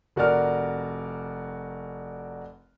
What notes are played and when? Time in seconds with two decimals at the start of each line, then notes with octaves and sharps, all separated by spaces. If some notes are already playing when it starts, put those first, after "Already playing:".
0.16 F1 F#4 A#4 D5 F6